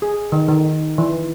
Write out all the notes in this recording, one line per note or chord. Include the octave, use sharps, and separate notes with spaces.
G#4
D#3
D#3
E3